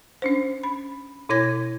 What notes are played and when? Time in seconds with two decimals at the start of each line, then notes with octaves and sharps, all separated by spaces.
0.22 C#4 D4 C5
0.63 B5
1.29 B2 E4 C#5 G#6 A#6